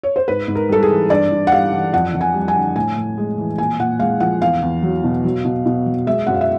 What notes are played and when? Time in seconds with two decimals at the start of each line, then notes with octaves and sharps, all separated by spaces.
0.03 C#5
0.16 C5
0.28 G#2 B4
0.48 G#2
0.55 A#4
0.69 G3 A4
0.82 G#4
0.89 E3
1.10 G2 D5
1.31 G2
1.47 F#5
1.52 G3 F5
1.72 E3
1.93 F2 F#5
2.14 F2
2.21 G#5
2.34 G3
2.48 G#5
2.55 D3
2.76 A2 G#5
2.97 A2
3.18 G#3
3.38 E3
3.58 A#2 G#5
3.79 A#2 F#5
4.00 G#3 F5
4.20 F3 F#5
4.41 E2 F5
4.62 E2
4.83 F#3
5.04 B2
5.24 F#3
5.45 B2
5.66 B2
5.86 F#3
6.06 G#3 E5
6.27 F#2 F#5
6.34 F5
6.41 E5